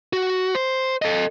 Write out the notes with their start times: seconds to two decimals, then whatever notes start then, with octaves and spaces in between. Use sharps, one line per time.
0.13 F#4
0.55 C5
1.02 A4 D#5